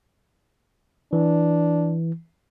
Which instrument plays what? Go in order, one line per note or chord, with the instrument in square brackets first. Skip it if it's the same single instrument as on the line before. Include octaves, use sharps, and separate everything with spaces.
[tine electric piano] E3 [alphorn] D4